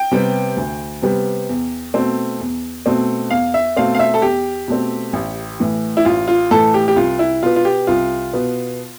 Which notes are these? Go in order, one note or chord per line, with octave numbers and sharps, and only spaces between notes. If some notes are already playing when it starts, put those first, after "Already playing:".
Already playing: G5
C3 G3 B3
D2
C3 G3 B3
E2
B2 A3 C4
E2
B2 A3 C4
E2 F5
E5
B2 A3 C4 F5
F5
E5
A4
E2 G4
B2 A3 C4
A1
A2 E3
E4
A1 F4
F4
A2 E3 A4
G4
G4
C2 F4
E4
B2 B3 F4
F4
G4
C2 F4
B2 B3